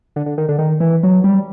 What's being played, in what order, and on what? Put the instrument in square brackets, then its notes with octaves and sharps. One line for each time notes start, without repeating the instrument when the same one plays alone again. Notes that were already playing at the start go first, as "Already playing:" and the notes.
[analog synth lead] D3
D3
D#3
D3
D#3
E3
F#3
G3